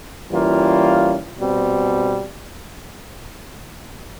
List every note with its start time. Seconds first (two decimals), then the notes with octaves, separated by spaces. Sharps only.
0.31 E3 G3 A#3 C#4 F4
1.37 B2 G3 C4